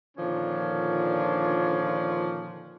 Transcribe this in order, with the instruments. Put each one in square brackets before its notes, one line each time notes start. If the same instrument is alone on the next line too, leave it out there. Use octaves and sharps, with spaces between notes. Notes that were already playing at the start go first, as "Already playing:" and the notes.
[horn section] A#2 D3 D#3 F3 C#4 D4